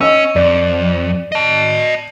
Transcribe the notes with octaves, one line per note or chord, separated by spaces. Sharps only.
C#4 D#5 E6
F2 D5
D#5 A5